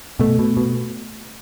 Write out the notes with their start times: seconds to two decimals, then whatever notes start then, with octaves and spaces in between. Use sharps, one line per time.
0.19 B2 A3
0.39 B2
0.57 B2